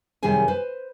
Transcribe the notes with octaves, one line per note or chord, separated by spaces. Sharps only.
F#2 C3 D#3 G3 G#4 G#5
B4 C5